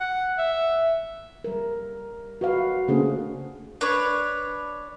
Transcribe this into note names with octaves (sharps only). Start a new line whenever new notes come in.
F#5
E5
G3 A#4
F#4 B4 F5
C#3 A3 A#3 D4 G#4 C5
D4 B4 C#5